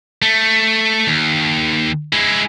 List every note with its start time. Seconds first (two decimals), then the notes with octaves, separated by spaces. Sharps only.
0.22 A3
1.07 D#2
2.13 G#3 E4